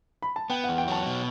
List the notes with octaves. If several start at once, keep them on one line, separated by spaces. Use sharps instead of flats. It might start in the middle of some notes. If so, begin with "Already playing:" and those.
B5
A5
B3 G5
F#5
E2
G5
F#3 A5
B2